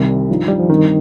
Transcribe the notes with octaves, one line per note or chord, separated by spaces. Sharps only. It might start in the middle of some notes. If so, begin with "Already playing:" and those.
Already playing: C2 C3 D#3 G3
G2 F3 D#4
G3
F3
G2 D#3 G3 C4 D#4